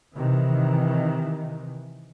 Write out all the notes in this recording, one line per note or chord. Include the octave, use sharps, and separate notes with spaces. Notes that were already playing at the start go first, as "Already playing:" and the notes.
C3 D#3 E3